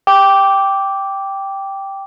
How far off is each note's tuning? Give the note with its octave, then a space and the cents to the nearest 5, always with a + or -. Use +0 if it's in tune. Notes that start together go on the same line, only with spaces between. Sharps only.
G5 +0 D6 -10